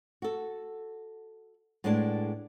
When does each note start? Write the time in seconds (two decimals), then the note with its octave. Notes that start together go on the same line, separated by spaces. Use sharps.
0.22 F#4 A4
1.84 A2 G#3 B3 D4 G#4 A5